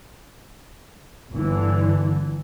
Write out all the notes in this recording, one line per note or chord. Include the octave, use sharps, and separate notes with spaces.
G1 D3 E3